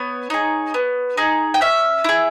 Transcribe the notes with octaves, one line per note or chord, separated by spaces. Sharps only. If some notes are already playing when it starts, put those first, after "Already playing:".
Already playing: B3 C#5
D#4 G#4
B3
D#4 G#4
G5
C#4 E5
E4 G#4